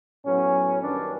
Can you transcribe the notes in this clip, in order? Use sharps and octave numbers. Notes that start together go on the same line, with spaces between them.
A2 F#3 B3 C#4
F#2 D#3 G3 B3 D4